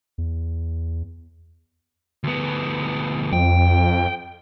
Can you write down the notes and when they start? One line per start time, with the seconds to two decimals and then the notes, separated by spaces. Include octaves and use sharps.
0.18 E2
2.24 D2 B3
3.33 F2 G5